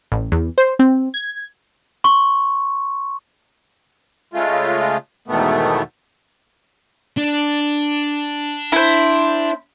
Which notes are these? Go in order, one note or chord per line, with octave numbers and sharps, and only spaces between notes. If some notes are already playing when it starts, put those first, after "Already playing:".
A1
E2
C5
C4
G#6
C6 C#6
C#3 G#3 A3 F4
E2 G#2 B2 D#3 A3 B3
D4
E4 C5